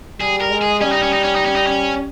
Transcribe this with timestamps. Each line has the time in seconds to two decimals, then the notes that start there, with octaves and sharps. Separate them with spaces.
0.20 G3 G#4
0.41 A#4
0.51 G#3
0.62 G#4
0.81 G3 C#4
0.92 D#4
1.02 C#4
1.13 D#4
1.24 C#4
1.35 D#4
1.45 C#4
1.56 D#4
1.67 C#4